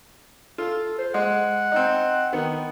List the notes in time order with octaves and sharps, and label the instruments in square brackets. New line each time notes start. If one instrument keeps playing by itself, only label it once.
[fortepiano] F4 [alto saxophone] A4
[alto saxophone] C5
[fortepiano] G#3 [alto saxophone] F#5
[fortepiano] C4 D#4
D#3 B3